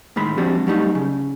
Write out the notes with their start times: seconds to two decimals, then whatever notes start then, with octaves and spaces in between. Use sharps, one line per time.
0.16 A2 D#3 G#3 B5
0.37 F3 G#3 C4 D4 F#4 G4
0.67 F#3 G3 A3 D#4
0.95 C#3